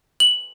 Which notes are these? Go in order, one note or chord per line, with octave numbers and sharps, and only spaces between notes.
F#7